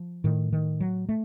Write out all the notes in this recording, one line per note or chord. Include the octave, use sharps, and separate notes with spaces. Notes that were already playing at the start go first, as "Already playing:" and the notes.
Already playing: F3
A2 D#3
D#3
F#3
A3